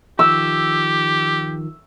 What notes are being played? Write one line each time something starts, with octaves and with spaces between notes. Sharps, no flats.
D#3 F3 G4 E6